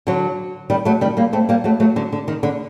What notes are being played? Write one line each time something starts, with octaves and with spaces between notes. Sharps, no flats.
D3 F#3
D#3 G3
F#3 A3
D#3 G3
G3 A#3
A3 C4
G3 A#3
F#3 A3
F#3 A3
D3 F#3
D3
D#3
D3